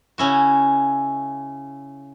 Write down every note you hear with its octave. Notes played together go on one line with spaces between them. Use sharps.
C#3 C#4 E4 F#4